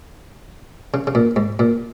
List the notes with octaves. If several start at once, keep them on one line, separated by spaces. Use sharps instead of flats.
C#3
C#3
A#2
G#2
A#2